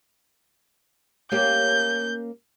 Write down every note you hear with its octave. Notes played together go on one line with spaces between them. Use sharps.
A#3 C#4 G4 G6